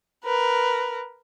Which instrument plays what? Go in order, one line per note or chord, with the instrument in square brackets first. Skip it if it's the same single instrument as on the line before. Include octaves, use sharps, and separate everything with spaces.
[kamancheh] A#4 B4